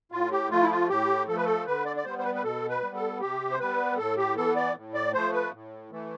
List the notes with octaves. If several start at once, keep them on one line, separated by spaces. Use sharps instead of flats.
A2 F4
G4
F3 A3 F4
E4
F4
A2 G4
F3 A3 A4 B4
A4
D3 B4
D5
D5
G3 B3 C5
C5
B4
B4
B2 A4
B4
G3 B3
A4
C3 G4
C5
G3 B3 B4
A2 A4
G4
E3 B3 A4
D5
A2
D5
F3 A3 C5
B4
A2
E3 A3